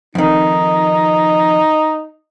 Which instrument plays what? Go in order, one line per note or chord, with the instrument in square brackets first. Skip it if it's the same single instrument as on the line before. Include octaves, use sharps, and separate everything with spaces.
[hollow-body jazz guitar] F2 D#3 [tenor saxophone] D#4